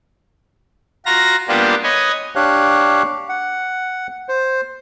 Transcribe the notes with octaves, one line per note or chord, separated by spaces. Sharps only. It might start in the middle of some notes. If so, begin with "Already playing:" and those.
F4 F#4 A#5 A#6
G3 A#3 B3 D4 F4 G4
B4 C#5 D#5 G#5
D4 G4 C#5 F5 F#6
F#5
C5